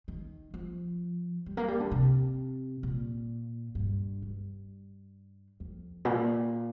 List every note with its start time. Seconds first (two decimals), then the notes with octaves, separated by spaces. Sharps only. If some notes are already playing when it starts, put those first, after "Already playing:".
0.08 D#3
0.54 F3
1.46 G3
1.57 A#3
1.68 G3
1.80 D3
1.91 C3
2.83 A#2
3.75 G2
4.22 G2
5.60 F2
6.05 A#2